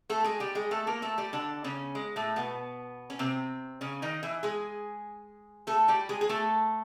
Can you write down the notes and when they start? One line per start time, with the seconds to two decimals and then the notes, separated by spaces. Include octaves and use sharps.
0.10 A3 A4
0.24 G#3 G#4
0.40 G3 G4
0.55 G#3 G#4
0.71 A3 A4
0.87 A#3 A#4
1.02 A3 A4
1.18 G3 G4
1.33 D3 D4
1.64 C#3 C#4
1.95 G#3
2.16 A2 A3
2.36 B2 B3
3.10 C#4
3.19 C3 C4
3.81 C#3 C#4
4.02 D#3 D#4
4.23 E3 E4
4.43 G#3 G#4
5.67 A3 A4
5.88 G3 G4
6.09 G#3 G#4
6.21 G#4
6.29 A3 A4